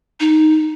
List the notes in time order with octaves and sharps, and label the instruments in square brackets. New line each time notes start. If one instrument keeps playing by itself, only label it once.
[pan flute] D#4